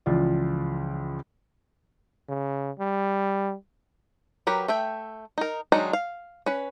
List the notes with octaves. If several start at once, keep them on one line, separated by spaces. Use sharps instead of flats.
C#2 E3 F3 F4 D5
C#3
G3
F#3 G4 A#4 B4
A3 E5 G5
D#4 A#4
D#3 F#3 G#3 D4 D#4
F5
C#4 B4